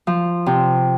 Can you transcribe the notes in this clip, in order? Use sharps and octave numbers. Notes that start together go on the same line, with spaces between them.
F3
C3